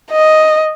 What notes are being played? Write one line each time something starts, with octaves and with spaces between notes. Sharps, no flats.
D#5